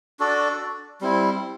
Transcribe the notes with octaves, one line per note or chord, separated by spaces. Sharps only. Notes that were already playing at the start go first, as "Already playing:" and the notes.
D4 F#4 A4 D5
G3 C4 E4